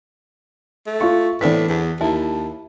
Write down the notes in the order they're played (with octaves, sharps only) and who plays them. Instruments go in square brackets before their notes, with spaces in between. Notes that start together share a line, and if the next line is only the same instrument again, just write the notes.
[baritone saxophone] A3
[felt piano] F4 F5 C#6
[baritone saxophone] A2 [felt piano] E3 B6 [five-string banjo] B3 C4 D4
[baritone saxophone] E2
[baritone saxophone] D#2 [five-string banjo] E4 [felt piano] A5